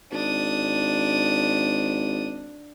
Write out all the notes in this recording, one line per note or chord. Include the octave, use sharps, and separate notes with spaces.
G#1 D4 D#6